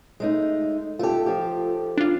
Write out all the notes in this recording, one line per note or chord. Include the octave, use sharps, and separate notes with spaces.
G#3 A3 D#4
A3 F4 G4 A4
F3 G4
D4 F4